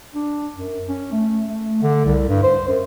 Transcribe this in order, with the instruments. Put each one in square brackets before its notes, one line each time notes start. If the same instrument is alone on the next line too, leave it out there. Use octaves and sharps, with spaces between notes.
[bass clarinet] D4
F#2
C#4
A3
A3
D3
C2
G2
C5
F#2